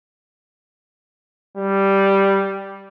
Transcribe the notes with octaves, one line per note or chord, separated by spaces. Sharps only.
G3